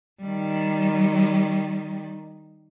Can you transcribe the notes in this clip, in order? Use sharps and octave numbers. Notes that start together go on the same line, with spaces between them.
D#3 G3